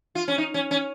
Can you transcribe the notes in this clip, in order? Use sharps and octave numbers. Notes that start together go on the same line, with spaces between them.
F4
C#4
D#4
C#4
C#4